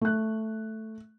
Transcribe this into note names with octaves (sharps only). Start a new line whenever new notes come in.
A3 F#6